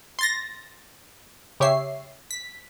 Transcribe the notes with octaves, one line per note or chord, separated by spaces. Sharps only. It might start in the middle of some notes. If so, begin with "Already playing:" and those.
C6 A6 A#6
C#3 G4 C#5 E5 C7
B6